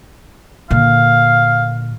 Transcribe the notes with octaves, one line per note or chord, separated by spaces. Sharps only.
A#2 D3 F5